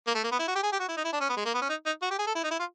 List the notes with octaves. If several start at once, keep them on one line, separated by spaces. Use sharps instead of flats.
A#3
A3
A#3
B3
E4
F#4
G4
G#4
G4
F#4
E4
D#4
E4
D4
C#4
B3
G#3
A#3
B3
C#4
D#4
D#4
F#4
G4
G#4
A4
E4
D#4
E4
F4